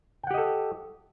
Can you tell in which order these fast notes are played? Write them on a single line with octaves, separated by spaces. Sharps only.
G5 F#5 G4 D#5 A4